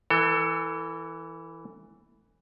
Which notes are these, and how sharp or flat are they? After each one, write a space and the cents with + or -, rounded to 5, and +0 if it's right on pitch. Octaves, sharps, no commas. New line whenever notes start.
E3 +0 A4 +30